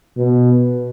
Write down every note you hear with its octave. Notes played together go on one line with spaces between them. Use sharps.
B2